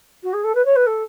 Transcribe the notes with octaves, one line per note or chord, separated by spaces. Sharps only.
F#4
G#4
A4
B4
C#5
B4
A4